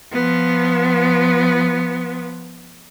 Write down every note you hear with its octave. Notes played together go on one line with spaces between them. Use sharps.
F3 B3